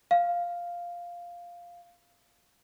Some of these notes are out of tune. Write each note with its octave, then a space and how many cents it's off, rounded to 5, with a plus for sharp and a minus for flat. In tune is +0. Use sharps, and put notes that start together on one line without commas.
F5 +0